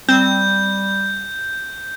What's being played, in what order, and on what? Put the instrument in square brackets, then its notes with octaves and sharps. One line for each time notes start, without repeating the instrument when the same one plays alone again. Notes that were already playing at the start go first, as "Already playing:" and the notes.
[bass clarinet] G3 [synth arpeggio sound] C4 [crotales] G6